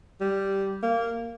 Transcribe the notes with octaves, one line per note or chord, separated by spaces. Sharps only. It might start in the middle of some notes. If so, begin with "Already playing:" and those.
G3
A#3